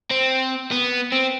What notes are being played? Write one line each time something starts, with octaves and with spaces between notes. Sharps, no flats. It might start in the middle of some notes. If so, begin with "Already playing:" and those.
C4
B3
C4